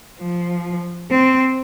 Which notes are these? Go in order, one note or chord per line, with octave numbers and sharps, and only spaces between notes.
F3
C4